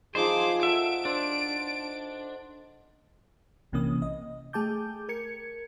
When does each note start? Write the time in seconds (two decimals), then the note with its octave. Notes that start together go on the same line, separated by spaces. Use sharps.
0.15 F3 D#4 G#4 C5 D6
0.63 A4 E5 F#5 D7
1.05 D4 C5
3.72 A#1 C3 E3 A#3 C#4 D#6
4.02 D#5
4.53 A3 G#4 G5 A5 D6 G6
5.09 A#4 G#6 C#7